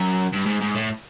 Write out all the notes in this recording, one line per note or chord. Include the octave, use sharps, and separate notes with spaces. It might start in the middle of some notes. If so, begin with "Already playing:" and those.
Already playing: F#2
G2
G#2
G#2
A2